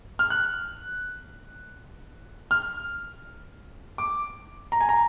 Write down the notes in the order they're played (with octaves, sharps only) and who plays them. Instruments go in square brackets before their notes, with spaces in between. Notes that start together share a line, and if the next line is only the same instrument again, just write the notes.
[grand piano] F6
F#6
F6
D6
A#5
G#5
A#5